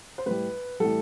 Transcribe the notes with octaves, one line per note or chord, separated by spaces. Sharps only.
C5
A2 G3 B4
A2 E3 G3 A4